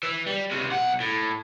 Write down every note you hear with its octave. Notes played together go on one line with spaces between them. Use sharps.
E3
G3
C#2 C3
B1 F#5
A2